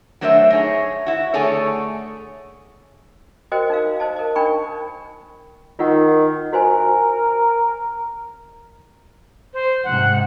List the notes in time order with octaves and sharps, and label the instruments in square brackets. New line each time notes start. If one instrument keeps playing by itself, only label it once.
[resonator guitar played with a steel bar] F#3 A3 D4 C5 D#5 E5
D#4 G#4 C#5
E4 F#4
D3 A3 G#4 A4 C#5
[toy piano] F#4 A#4 C5 D#5 G5
D#4 A#4 F5
C5 D#5 A5
A#4 D#5
D4 D#4 A#4 G5 B5 C#6
[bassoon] D#3 [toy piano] F4 A#4 F#5
[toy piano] F#4 C5 G#5 [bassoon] A#4
[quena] C5
[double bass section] G#2 C3 [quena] F#5